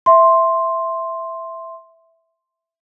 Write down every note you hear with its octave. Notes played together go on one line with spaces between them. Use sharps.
E5 C6